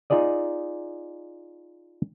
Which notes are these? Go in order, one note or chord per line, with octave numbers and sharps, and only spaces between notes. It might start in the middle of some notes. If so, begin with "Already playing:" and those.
D#4 F4 G#4 D5 D#5